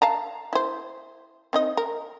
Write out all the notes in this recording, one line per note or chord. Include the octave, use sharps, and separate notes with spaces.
F5 A5 A#5
E4 C5
C4 D#4 D#5
A#4